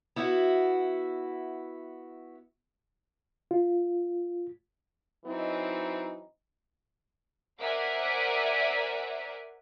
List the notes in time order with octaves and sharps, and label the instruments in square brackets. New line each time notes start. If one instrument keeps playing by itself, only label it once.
[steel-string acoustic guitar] B3 E4 F#4
[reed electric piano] F4
[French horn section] E3 F#3 C4 D#4
[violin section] A#4 C5 D5 E5 F#5 G#5